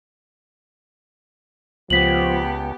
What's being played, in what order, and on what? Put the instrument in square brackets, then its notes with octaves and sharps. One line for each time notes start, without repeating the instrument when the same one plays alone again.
[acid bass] C#2 [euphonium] F3 [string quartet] B3 G4 [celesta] B6 F#7